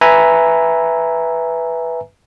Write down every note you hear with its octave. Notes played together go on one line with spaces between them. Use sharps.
B4 E5 G#5 A#5